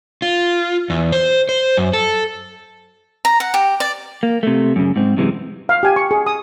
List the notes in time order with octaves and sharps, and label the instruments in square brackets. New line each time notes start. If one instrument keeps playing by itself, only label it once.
[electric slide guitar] F4
E2
C5
C5
F#2
A4
[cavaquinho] A#5
F#5
G4
D5
[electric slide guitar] A#3
C3 A3
F#2 C#3
G#2 C4
F#2 C3 E3 G#3
[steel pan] F5
G4 G#5
C#6
G#4
D#6